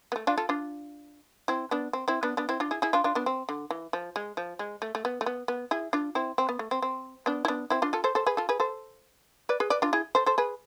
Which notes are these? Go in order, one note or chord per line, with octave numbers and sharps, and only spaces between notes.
B3
A3
D4 F4
F4 A4
D4 F4
C4 E4
B3 D4
C4
C4 E4
B3 D4
B3 D4
C4 E4
D4 F4
E4 G#4
E4 G#4
D4 F4
D4 F4
B3 D4
C4
D3
E3
F3
G#3
F3
G#3
A3
A3
B3
A3
B3
B3
E4 G#4
D4 F4
C4 E4
C4
B3
A3
C4
C4
B3 D4
E4
B3 D4
C4 E4
D4 F4
F4 A4
A4 C5
A4 C5
G#4 B4
F4 A4
G#4 B4
A4 C5
B4 D5
G#4 B4
B4 D5
D4 F4
E4 G#4
A4 C5
A4 C5
G#4 B4